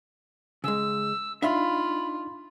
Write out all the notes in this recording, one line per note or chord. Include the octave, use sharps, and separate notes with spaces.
C#3 G#3 E6
D4 D#4 F4 E5 F5 B5 C6